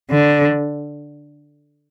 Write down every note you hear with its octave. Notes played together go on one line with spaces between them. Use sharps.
D3